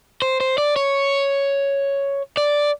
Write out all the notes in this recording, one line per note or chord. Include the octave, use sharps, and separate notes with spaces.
C5
C5
D5
C#5
D5